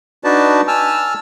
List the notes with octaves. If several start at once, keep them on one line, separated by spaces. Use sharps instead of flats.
D4 D#4 F#4 B4 D5 A5
G#5 A5 E6 F6